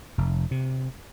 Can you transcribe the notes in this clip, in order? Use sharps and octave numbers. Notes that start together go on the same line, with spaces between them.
F1
C3